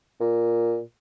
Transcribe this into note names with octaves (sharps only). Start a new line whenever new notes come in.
A#2